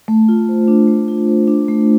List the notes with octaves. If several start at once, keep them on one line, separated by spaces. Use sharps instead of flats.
A3
F4
C5
D4
A3
F4
C5
D4
A3